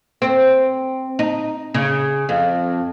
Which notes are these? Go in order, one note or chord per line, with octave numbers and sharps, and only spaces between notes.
C4
D#4
C#3
F2